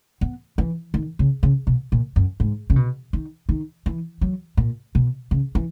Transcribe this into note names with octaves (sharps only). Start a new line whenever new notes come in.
B3
E3
D#3
C#3
C#3
B2
A#2
F#2
G#2
C#3
B2
D#3
D#3
E3
F#3
A#2
B2
C#3
E3